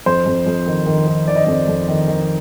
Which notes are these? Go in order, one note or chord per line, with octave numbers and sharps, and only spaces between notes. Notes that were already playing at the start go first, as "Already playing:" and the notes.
F2 C5
F2
F2
D#3
D#3
D#3
D#3 D5
D#5
F2 D5
F2
D#3
D#3